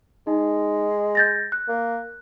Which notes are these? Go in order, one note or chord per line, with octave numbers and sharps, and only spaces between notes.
G#3 D#4
G6 A6 A#6
F#6
A#3